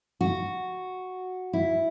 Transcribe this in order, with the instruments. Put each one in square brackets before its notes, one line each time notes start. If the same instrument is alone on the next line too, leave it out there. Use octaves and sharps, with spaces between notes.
[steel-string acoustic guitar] F#4
E4